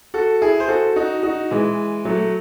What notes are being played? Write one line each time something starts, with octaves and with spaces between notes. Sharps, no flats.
F#4 A4
E4 G#4
C5
F#4 A4
D#4 F#4
D#4 F#4
E3 G#3
F#3 A3